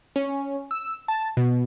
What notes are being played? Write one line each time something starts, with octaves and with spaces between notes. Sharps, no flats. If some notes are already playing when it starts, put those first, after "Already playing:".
C#4
E6
A5
B2